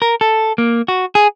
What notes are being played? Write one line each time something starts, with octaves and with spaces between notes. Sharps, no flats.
A#4
A4
A#3
F#4
G#4